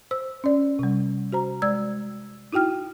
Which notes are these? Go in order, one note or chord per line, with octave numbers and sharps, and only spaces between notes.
C5 E6
C#4 D5
C3 G3
F#4 C5 A#5
G#3 D5 E6 G#6
D#4 E4 F#4 G5 F6